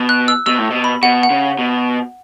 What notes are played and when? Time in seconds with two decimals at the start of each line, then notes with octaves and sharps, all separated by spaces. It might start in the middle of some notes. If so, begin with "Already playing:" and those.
Already playing: B2
0.09 F#6
0.28 E6
0.46 B2 E6
0.59 A2
0.70 B2
0.84 B5
1.03 B2 F#5
1.23 F#5
1.31 C#3
1.59 B2